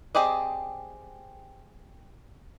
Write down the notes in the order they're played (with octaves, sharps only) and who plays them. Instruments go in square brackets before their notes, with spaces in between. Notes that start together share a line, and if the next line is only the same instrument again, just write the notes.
[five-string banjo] C4 G4 G#4 D5 D#5